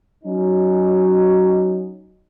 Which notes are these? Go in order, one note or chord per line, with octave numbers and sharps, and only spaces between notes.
F#3 C#4 D#4